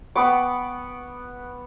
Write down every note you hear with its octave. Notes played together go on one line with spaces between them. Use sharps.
B3 B5 C#6 D6